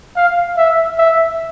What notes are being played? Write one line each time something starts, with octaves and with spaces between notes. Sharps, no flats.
F5
E5
E5